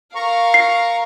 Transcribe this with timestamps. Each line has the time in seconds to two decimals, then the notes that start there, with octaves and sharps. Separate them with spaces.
0.15 A#4 F5 A#5 C#6
0.54 C7